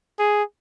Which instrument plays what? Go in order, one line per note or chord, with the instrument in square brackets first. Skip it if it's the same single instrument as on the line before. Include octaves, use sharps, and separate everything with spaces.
[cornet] G#4